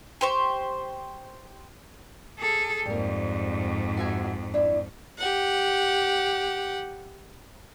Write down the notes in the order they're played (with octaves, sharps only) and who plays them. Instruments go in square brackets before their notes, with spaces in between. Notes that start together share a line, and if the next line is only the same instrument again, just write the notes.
[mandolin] G4 C5 C#6
[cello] G#4 A4
[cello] F2 G#2 [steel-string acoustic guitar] G3 A#3
[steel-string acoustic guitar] F#4 E5 G#5
D4 E4
[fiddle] G4 F#5